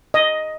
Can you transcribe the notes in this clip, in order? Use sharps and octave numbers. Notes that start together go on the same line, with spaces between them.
D#5